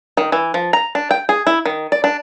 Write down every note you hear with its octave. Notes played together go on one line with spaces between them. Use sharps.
D#3
E3
F3
A#5
D4
G5
G#4
E4
D#3
D5
D4